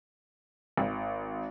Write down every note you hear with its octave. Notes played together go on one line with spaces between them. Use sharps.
G#1